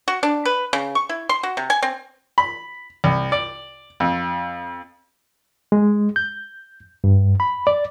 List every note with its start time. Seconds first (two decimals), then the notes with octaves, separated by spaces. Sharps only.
0.08 F#4
0.23 D4
0.45 B4
0.73 C#3
0.95 C#6
1.09 E4
1.29 C6
1.43 F#4
1.57 C3
1.70 G#5
1.82 C4
2.38 B5
3.04 C2
3.32 D5
4.00 F2
5.72 G#3
6.16 G6
7.04 G2
7.40 B5
7.67 D5